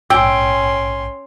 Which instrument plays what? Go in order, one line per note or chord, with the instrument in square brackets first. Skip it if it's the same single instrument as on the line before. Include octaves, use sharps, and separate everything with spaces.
[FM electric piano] A#1 G#2 [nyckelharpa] C#4 C6 [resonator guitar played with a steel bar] G5 [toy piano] G#5 E6